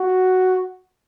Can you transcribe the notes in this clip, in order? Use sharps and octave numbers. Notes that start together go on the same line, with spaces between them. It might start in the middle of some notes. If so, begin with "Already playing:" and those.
Already playing: F#4